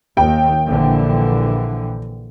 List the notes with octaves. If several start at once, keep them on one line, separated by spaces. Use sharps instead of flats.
D#2 G5
A#1 D3 E3